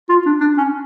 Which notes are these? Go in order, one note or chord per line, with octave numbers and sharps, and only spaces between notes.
F4
D4
D4
C#4